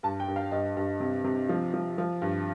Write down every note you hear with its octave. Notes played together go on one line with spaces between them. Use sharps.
G2 A5
G5
G2
F5
G2 D#5
G2
C3
C3
F3
F3
F3
G2